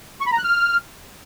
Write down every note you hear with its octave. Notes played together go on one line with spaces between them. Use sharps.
C#6
B5
A#5
F#6
F6